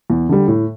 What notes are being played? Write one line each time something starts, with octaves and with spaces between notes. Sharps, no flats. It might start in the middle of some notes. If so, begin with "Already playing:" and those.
E2
D3 G3
A2